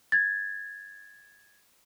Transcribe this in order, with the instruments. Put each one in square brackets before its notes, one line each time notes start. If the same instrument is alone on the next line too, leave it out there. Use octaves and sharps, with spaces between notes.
[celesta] G#6 A6